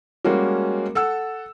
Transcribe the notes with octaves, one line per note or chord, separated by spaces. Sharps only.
G3 G#3 A#3 C#4 F#4
A4 F#5 E6